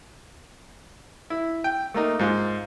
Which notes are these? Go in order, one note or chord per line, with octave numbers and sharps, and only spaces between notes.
E4
G5
A3 A#3 D#4
G#2 F4